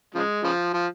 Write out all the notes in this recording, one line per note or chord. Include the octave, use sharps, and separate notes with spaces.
C#3 F3 G#3
C#3 F3
F3